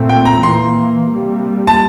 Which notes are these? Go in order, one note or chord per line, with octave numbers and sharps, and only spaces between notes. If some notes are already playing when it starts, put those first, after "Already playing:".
Already playing: A#2 A3 C4
G5
A#5
E3 A#3 C6
C3 G3 A#3
A5